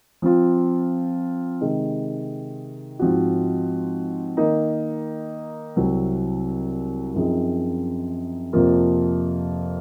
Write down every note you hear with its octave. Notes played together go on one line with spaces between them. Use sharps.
F3 C4 F4
C3 D#3 G#3
G#2 F3 C4 F#4
D#3 A#3 D#4
C2 C3 F#3 C4
F#2 F3 C4 D#4 G#4
F2 C3 F3 A#3 F4